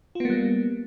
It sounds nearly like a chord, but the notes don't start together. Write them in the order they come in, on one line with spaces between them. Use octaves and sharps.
F4 B3 A#3 G3